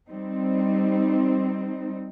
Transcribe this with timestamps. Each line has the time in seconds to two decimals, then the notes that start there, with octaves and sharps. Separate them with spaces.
0.10 G3 C4 D#4